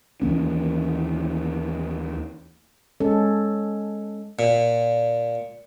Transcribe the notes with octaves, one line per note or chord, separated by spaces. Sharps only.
D#2 E3 A#3 C#4
G#3 C#4 A4
A#2